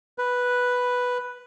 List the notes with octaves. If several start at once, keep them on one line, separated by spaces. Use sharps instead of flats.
B4